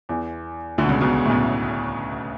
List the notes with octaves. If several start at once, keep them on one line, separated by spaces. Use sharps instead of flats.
E2 E3
D2 D3
B2
C#2 C#3
B1 B2
A2
B1 B2